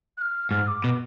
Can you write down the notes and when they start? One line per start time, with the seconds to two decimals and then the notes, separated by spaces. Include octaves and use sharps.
0.17 F#6
0.21 F6
0.51 G#2 F6
0.67 D6
0.84 B2